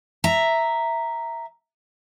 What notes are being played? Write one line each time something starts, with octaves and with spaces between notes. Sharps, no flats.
E5 A#5